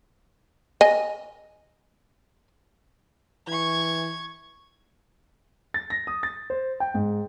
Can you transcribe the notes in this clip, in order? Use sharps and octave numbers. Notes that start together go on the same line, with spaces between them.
D#5 G#5
E3 C#6 G#6
A6
A#6
D#6
A6
C5
G5
G#2